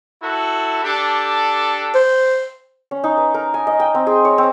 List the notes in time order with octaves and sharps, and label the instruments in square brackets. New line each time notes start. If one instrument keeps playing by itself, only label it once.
[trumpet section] E4 F#4 A4
D4 G4 A4
[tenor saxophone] C5
[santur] C#4
D#4
B4
A#4
G#5
D#5
G5
C4
G#4
C#5
C4